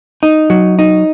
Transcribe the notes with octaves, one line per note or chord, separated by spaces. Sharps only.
D#4
F#3
D#4